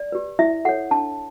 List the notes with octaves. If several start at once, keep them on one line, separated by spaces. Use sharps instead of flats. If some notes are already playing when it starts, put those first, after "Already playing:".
Already playing: D5
G4 B4
E4 E5
A4 C#5 F#5
D4 A5